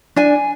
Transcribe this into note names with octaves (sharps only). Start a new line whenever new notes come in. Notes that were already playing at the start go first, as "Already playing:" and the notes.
D4 G#5